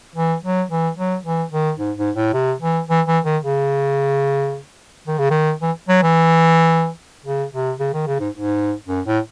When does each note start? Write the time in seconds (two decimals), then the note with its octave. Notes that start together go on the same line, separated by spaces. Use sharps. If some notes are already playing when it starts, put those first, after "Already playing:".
0.16 E3
0.43 F#3
0.70 E3
0.97 F#3
1.24 E3
1.52 D#3
1.79 G#2
1.97 G#2
2.16 A2
2.33 C3
2.61 E3
2.89 E3
3.07 E3
3.25 D#3
3.43 C#3
5.07 D#3
5.18 C#3
5.30 D#3
5.61 E3
5.88 F#3
6.02 E3
7.25 C#3
7.52 C3
7.79 C#3
7.93 D#3
8.07 C#3
8.20 G#2
8.35 G#2
8.88 F#2
9.06 A2